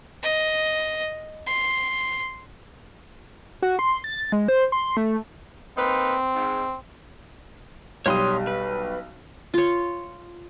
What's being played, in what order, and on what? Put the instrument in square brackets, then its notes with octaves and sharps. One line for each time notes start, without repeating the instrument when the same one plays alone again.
[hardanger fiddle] D#5
C6
[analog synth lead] F#4
C6
A6
G#3
C5
C6
A3
[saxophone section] A#3 D#4 B4 [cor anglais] C4
[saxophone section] G#2
[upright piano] B1 G3 [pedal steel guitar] C#5 C6 D#6
[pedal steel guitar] B4
[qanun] F4 C#5